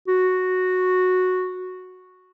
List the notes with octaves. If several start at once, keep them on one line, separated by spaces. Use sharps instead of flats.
F#4